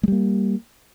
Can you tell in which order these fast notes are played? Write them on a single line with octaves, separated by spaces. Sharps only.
G#3 G3 A#3